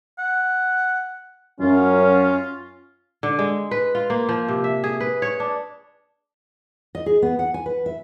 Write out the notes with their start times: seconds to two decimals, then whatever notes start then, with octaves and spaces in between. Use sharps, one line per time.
0.18 F#5
1.61 F#2 C#4 F4
3.23 D3
3.39 G#3
3.71 B4
3.95 F4
4.10 A#3
4.29 F3
4.48 C3
4.64 E5
4.84 G#4
5.00 B4
5.22 C#5
5.40 D4
6.95 D#5
7.06 G#4
7.22 B3
7.39 F#5
7.54 G#5
7.66 B4
7.86 E5